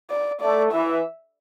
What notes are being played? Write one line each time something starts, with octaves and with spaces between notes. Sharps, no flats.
D5
A3 D5
E3 E5